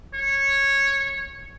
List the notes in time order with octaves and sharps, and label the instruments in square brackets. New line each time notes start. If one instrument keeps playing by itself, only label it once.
[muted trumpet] C#5